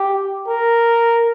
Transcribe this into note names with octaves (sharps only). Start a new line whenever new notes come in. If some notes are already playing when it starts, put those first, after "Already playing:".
Already playing: G4
A#4